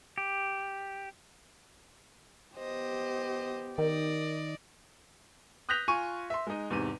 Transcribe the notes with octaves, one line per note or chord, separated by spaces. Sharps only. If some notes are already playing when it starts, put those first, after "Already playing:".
G4
B3 G4 C5 D#5
D#3 A#4 D5 D#5
D#6 F#6 G6 A#6 B6 F7
F4 G#5 C#6 D#7
E5 C6
G#3 D#4
E2 G#2 C3 D#7